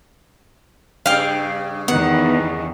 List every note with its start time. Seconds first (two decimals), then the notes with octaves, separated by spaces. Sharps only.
1.06 G2 C#3 F5 G5
1.88 E2 D#3 B3 F#5